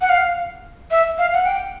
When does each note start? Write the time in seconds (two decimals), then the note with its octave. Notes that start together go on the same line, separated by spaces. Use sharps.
0.01 F#5
0.09 F5
0.91 E5
1.18 F5
1.34 F#5
1.45 G5